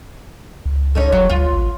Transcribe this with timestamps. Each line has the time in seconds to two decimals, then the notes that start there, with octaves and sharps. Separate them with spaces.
0.66 C#2
0.95 C#4 D#4 A4
1.12 F1 F#3
1.30 D2 F4
1.53 A1